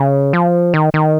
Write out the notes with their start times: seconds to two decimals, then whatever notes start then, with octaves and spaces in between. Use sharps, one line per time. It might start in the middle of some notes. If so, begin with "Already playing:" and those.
Already playing: C#3
0.33 F3
0.74 D#3
0.94 D#3